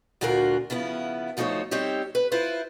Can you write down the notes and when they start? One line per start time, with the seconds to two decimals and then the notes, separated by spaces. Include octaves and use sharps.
0.21 D2 A#2 D4 F4 F#4 A#4
0.70 C#3 F3 B3 E4
1.37 D2 F3 A3 D#4 C5 C#5
1.71 G3 C4 D#4 G4 C#5
2.15 B4
2.31 E4 F4 B4 C5